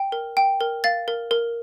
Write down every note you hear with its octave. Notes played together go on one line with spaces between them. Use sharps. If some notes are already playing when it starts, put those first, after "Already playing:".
Already playing: G5
A#4
G5
A#4
F5 A6
A#4
A#4